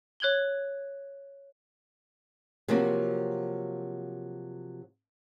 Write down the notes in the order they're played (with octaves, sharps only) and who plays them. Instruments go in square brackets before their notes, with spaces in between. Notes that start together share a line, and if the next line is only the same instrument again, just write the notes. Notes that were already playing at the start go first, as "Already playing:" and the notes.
[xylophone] C#5 F#6 G#6 F#7 G7
[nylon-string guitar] C3 F3 F#3 A#3 C4 F#4